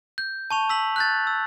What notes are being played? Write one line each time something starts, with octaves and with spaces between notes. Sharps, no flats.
G6
A5 C#6 F7
E6 B6 F#7
F#6 G6 A6
E6